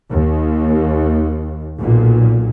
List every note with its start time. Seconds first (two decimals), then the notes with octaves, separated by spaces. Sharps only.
0.11 D#2
1.79 B1 A#2